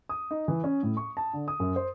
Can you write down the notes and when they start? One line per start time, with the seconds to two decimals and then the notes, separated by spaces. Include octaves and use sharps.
0.09 D#6
0.31 D#4
0.48 E3
0.64 C#4
0.83 A2
0.97 C#6
1.17 A5
1.33 D3
1.48 D#6
1.60 F#2
1.76 C5